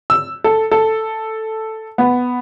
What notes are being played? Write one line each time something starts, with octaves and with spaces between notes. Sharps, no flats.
E6
A4
A4
B3